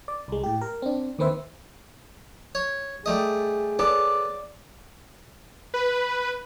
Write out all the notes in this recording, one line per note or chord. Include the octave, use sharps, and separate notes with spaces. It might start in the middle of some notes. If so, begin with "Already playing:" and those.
D5
C2 G#3
A2 G4
A#4
C4 D4
D#2 D#3 C4 B4 C5 E5
C#5
G3 A3 G#4 D#5
B3 A4 D5
B4